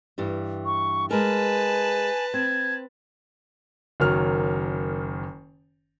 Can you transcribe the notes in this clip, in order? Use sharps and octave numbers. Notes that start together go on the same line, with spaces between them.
G2 E3 G3
C#6
G#3 A#4 B4 G#5 A5
C4 G#6
F#1 D#3 F#3 F6